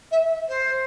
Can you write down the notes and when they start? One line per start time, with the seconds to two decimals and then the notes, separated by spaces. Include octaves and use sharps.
0.11 E5
0.48 C5